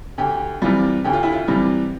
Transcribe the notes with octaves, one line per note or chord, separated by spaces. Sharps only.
D2 G4
C3 E3 G3 F4
D2 G4
F4
E4
F4
C3 E3 G3